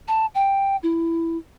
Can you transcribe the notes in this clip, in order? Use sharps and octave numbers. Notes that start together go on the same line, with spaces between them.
A5
G5
E4